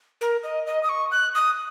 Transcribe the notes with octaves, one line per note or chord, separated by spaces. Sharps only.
A#4
D#5
D#5
D#6
C#6
F#6
D#6